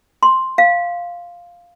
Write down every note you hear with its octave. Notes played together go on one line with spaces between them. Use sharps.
C6
F5